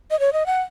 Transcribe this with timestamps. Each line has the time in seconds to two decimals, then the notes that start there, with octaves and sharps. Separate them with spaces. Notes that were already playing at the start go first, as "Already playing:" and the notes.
0.11 D#5
0.20 C#5
0.33 D#5
0.46 F#5